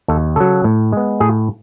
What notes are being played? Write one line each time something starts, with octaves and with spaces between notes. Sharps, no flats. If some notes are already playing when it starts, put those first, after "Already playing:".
D#2 A4
C#3 F#3 A4
A2
G#3 B3
A2 G#4